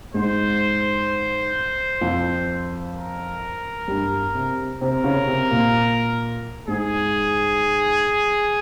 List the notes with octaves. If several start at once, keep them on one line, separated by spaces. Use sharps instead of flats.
G#2 G#3 C5
F2 F3
A#4
G2 G3
C3 C4
C3 C4 A#4
C#3 C#4
C3 C4
A#2 A#3
G#2 G#3 G#4